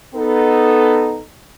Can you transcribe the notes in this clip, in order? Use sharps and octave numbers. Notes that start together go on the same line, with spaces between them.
B3 D#4 A4